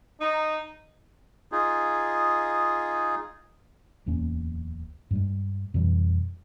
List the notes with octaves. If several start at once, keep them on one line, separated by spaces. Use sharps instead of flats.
D#4
D#4 F4 G#4
D1 E2 A#3 C#4
G2 G3 G#3
F2 B2 E3 G3